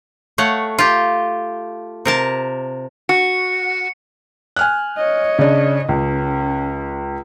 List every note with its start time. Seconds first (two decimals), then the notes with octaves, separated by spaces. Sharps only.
0.38 A3 C#5 F5 F#5
0.79 F4 G4
2.05 C3 A#4 A5
3.09 F#4 C#7
4.56 G#5 F6 F#6
4.97 C#5 D#5
5.39 C#3 D4
5.89 C#2 C#4